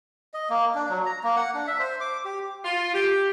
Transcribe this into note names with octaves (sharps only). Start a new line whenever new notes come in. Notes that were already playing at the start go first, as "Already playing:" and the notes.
D#5
A#3
D4
F#3
A#5
A#3
F#5
D4
E5
C5
D6
G4
F4
G4